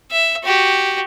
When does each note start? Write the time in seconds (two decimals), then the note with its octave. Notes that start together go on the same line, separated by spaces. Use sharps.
0.11 E5
0.44 F#4 G4